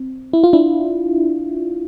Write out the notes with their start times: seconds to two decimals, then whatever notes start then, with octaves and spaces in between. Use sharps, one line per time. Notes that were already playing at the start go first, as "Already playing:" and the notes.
Already playing: C4
0.33 E4
0.44 F4
0.53 D4 E4